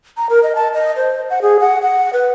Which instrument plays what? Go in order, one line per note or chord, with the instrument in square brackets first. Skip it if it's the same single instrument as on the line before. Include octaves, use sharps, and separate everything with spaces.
[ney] A#5
A#4
D#5
A5
D#5
C5
F#5
G#4
F#5
F#5
B4